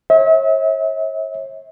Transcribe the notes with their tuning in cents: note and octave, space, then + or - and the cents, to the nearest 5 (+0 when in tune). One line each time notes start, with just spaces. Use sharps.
C#5 -40 E5 -40